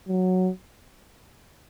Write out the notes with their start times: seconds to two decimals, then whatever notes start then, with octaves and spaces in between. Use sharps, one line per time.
0.08 F#3